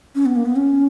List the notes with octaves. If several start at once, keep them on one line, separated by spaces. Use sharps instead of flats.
C#4
B3
A#3
B3
C#4